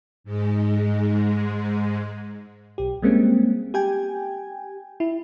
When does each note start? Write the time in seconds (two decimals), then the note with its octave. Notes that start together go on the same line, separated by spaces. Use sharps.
0.24 G#2 G#3
2.78 B1 G4
3.02 G3 G#3 A#3 C4 C#4
3.74 G4 G5 G#5
5.00 E4